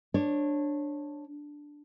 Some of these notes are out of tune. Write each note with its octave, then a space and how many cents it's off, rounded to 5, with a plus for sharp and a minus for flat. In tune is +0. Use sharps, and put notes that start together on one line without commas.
D4 +0 C#5 -20